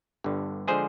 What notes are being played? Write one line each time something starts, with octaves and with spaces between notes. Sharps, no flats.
G1 G2 D3
D3 F3 G#3 G#4 C5